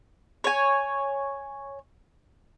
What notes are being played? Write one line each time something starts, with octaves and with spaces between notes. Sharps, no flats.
C#5 G#5